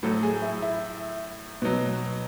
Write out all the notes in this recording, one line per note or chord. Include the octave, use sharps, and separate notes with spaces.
A2 F#3 A4
G#4
E4
E4
B2 F#3